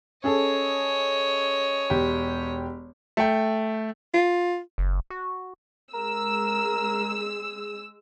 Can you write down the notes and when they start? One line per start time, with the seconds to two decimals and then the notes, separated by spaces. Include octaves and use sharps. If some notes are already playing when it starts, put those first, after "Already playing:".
0.24 C#4 G#4 A4 C#5 D#5
1.90 E1 G4
3.17 A3 G5
4.14 F4
4.78 F#1
5.10 F#4
5.94 G#3 A#4 E6